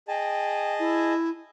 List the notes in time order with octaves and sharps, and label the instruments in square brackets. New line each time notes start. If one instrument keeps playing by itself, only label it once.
[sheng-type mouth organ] G#4 D#5 A5 [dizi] G5
[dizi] E4